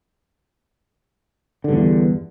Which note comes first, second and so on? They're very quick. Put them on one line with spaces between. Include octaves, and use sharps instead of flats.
D3 G2 E2